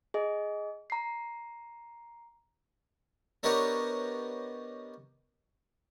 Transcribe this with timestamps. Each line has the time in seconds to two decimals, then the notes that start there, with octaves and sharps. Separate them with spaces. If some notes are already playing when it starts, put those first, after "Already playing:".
0.14 G#4 D#5
0.90 A#5 C7
3.43 B3 D4 G4 A#4 C#5 D#5